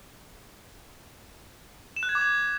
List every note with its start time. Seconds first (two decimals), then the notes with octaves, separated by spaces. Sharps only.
1.96 E7
2.03 F#6
2.09 G#6
2.15 D6
2.21 G#6